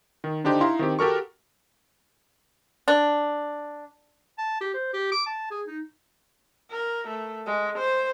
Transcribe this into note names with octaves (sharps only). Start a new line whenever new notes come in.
D#3
D3 D4 D#4 G4 C5
D#4 E4 F5 A#5 C6
D#3 C4 G4
F#4 G4 A4 A#4 C#6
D4
A5
G4
C5
G4
D6
A5
G#4
D#4
A#4
A3
G#3
C5